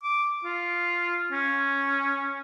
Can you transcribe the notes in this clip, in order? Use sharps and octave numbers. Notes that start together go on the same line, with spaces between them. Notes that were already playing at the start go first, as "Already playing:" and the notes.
D6
F4
C#4